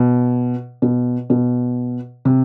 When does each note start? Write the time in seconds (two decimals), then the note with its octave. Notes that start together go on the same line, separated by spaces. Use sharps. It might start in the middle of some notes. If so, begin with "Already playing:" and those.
Already playing: B2
0.82 B2
1.30 B2
2.25 C3